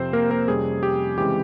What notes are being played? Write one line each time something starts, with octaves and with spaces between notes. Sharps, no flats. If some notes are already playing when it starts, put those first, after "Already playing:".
Already playing: F2 C3 F3 C4 C5
A#3 A#4
A#3 A#4
F2 C3 G3 C#4 G#4
G4
C#3 E3 G#3 C4 G4